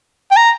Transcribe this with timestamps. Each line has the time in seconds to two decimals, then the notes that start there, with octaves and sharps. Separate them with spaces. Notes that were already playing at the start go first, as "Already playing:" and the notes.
0.31 G5
0.37 A#5